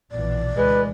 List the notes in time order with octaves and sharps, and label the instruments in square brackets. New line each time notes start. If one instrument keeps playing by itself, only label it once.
[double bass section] A#1 B2 E3 [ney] D5
[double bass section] D2 E3 [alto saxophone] G#3 [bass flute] B4